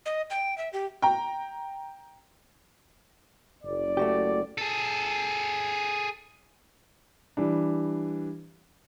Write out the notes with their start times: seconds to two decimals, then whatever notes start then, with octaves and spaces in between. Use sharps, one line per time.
0.06 D#5
0.30 G5
0.58 E5
0.73 G4
1.02 G5 A#5
3.63 F#1 D5
3.97 A3 F#4 G4
4.58 G#4 A4
7.37 E3 G3 D4